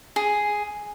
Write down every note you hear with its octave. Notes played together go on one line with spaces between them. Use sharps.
G#4